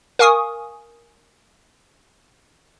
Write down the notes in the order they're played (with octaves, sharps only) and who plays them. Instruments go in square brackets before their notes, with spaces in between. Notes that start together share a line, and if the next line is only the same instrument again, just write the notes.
[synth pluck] A#4 F5 G#5 C#6 D#6